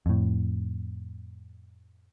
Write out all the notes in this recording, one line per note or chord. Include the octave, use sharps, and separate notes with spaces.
F2 A2